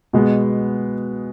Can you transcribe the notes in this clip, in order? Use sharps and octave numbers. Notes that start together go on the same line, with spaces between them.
B2 G#3 B3